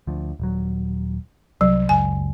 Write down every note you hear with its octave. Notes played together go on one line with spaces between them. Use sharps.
D2 F3
D#1 F#3
C2 F#3
F#1 C#2 G#5